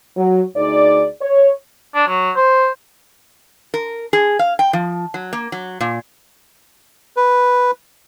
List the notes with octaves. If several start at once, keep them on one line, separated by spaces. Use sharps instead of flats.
F#3
D2 D#4 G#4 D5
C#5
D4
F#3
C5
A#4
G#4
F5
G5
F3
F#3
A#3
F#3
A#2
B4